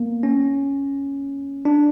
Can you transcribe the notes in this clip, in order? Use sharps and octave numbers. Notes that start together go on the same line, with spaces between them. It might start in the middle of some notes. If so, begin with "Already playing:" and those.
Already playing: A#3 B3
C#4
D4